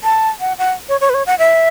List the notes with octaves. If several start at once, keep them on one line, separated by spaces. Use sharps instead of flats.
A5
F#5
F#5
C#5
C#5
B4
C#5
F#5
E5